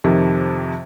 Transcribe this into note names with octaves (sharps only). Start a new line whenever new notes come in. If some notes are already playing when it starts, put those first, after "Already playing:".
F2 C3 D#3